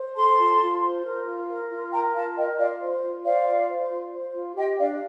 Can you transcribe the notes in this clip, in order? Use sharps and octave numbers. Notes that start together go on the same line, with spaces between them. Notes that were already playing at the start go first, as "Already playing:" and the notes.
Already playing: C5
A4 A5 C6
F4
F4
C5
A#4
F4
A#4
F4
A#4 G5 A#5
F4 F5 A5
A#4 D#5 G5
F4 D5 F5
C5
F4
C5 D5 F5
F4
C5
F4
C5
F4
G4 D#5 G5
D4 D5 F5